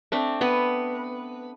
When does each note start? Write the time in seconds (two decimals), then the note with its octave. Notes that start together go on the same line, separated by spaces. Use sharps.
0.12 A3 C4 D4
0.41 B3 B4